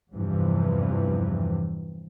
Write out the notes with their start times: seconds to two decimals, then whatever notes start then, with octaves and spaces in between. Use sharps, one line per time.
0.13 E2 G2 C3 E3 F3